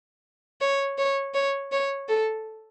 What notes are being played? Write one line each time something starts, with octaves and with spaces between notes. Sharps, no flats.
C#5
C#5
C#5
C#5
A4